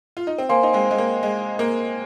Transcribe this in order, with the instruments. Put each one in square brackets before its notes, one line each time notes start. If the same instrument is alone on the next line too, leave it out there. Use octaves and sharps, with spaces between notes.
[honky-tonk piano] F4
D#4
C4
[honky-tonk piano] A#3 [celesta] C5 F5 G#5 C6
[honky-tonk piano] D#4
G#3 C4
G#3
A#3
G#3
A#3